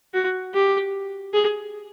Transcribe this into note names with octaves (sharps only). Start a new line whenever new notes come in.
F#4
G4
G#4